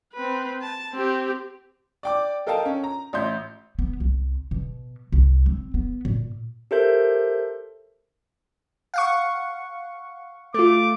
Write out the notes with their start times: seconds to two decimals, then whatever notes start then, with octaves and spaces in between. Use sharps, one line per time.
0.14 C4 B4
0.61 A5
0.93 C4 G4
2.03 D5 G5 D6
2.47 A4 A#4 D#5 F5 G5 A5
2.65 C#4
2.84 A#5
3.13 A1 E5 C6 G6
3.79 B3
4.00 C2
4.51 B2
5.12 C2
5.46 C4
5.74 B3
6.05 A#2
6.71 G4 A4 A#4 C5 E5 G6
8.94 F5 F#5 C#6
10.54 A3 F4 D6